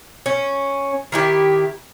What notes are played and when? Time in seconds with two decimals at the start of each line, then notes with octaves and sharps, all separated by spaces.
0.26 C#4
1.12 D#3 E4 G4